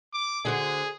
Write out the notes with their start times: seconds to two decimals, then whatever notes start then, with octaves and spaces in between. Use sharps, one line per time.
0.13 D6
0.45 D3 F#4 G#4 C5